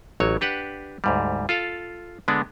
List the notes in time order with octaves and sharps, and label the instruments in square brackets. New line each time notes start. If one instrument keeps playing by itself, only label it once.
[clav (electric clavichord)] A1 F#3 C#5
D4 G4 B4 F#5
D2 G#2 G3
F4 A4 F5
D3 G#3 B3 D4